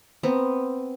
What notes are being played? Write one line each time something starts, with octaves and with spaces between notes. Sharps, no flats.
B3 C4 A#5